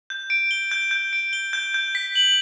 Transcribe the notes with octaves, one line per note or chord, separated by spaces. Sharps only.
G6
D7
G7
G6
G6
D7
G7
G6
G6
B6
F#7